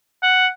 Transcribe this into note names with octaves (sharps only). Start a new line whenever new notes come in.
F#5